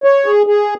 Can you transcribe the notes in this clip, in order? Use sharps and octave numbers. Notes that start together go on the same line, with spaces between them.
C#5
G#4
G#4